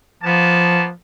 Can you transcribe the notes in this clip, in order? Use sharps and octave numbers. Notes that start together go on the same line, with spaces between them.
F3 A#3 B3 A5